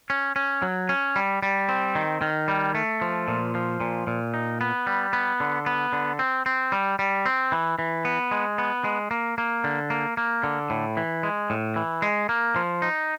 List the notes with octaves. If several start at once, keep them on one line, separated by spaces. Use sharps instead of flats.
C#4
C#4
F#3
C#4
G3
G3
C4
D#3
D#3
G3
A3
F3
A#2
F3
A#2
A#2
D#4
B3
G3
B3
D3
B3
D3
C4
C4
G3
G3
C4
E3
E3
B3
G#3
B3
G#3
A#3
A#3
D3
A#3
A#3
D3
A2
E3
G#3
A2
E3
G#3
A#3
F3
D#4